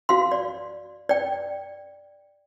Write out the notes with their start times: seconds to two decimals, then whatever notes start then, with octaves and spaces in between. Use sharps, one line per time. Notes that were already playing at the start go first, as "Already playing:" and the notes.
0.09 F#4 F5 C6
0.32 D5
1.09 D5 G5